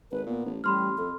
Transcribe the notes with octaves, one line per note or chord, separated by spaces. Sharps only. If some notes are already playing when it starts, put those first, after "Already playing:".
G#1 B4
A#2 B3
A1
A1 G3 B5 C6 F6
F2 A4